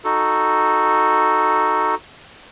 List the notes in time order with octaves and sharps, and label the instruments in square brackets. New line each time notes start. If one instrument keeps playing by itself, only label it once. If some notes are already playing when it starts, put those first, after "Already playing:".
[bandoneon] D#4 F#4 A4